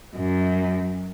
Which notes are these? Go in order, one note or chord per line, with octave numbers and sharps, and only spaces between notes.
F#2